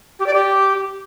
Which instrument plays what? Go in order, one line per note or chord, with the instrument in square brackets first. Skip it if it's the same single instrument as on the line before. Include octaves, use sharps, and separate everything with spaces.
[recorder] G4
D5
G4